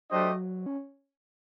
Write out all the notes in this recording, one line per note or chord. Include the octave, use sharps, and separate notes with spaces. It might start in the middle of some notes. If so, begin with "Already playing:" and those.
F#3 A3 D4 G4 C5 D#5
C#4